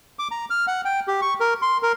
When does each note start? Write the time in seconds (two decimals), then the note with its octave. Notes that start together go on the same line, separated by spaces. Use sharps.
0.19 D6
0.31 A#5
0.50 F6
0.68 F#5
0.85 G5
1.08 G4
1.22 C#6
1.40 A#4
1.62 C6
1.83 A#4